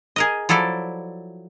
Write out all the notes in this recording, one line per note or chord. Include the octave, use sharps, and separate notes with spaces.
G#4 A#4 D#5
F3 F#3 E4 A4 D5